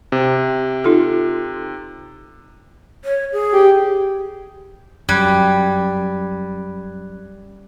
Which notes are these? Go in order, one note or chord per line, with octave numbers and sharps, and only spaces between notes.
C3
D#4 F4 A4
C#5
G#4
G4
F#2 G3 B5 F#6 G#6